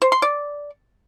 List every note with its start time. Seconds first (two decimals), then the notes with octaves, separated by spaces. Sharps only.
0.02 C5
0.12 C6
0.22 D5